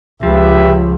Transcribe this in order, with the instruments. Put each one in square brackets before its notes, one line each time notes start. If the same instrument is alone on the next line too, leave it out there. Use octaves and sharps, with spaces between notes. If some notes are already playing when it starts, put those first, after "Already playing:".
[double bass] C#2 [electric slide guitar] F3 [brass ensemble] G4 B4 E5